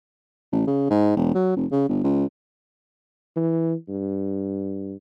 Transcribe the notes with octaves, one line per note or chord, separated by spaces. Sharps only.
A1
C#3
G#2
E1
F#3
F1
C#3
G1
C#2
E3
G2